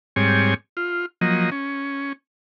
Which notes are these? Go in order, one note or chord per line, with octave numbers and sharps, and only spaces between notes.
G#2 G3 C4 C#5 G#5
F4
F3 F#3 A#3 D#5
C#4